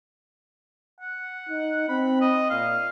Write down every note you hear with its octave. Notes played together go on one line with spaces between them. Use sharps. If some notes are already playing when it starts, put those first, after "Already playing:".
F#5
D#4
C4 B5
D#5
A#2 F5